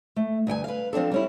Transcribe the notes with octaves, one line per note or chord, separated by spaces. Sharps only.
A3
D2 G2 G5 G#5
B4 F5
F3 C4 D4 A4
G3 C#4 E4